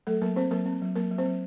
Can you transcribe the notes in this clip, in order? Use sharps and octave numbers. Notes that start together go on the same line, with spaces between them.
F#3 A3 A4
F#3 A#3 A#4
C4 C5
F#3 A#3 A#4
C4
F#3
F#3 A#3 A#4
F#3
C4 C5
F#3